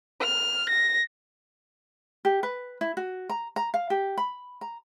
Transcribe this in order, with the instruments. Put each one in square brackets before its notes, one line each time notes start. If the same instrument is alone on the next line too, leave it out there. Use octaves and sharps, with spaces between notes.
[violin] F6
A#6
[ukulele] G4
B4
E4
F#4
A#5
A#5
F5
G4
B5
A#5